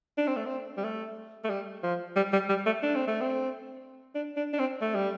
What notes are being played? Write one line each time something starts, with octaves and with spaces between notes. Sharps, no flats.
D4
C4
A3
C4
G3
A3
A3
G3
F3
G3
G3
G3
A3
D4
C4
A3
C4
D4
D4
D4
C4
A3
G3